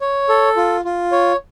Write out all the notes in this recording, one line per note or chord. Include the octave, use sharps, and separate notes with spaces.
C#5
A4
F4
F4
C#5